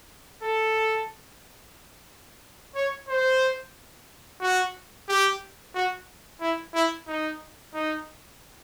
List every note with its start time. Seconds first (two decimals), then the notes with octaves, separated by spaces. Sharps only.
0.42 A4
2.75 C#5
3.08 C5
4.41 F#4
5.08 G4
5.75 F#4
6.41 E4
6.74 E4
7.07 D#4
7.74 D#4